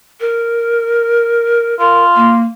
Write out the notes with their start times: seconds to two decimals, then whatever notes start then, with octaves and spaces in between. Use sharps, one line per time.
0.20 A#4
1.79 F4 A#4
2.16 A#3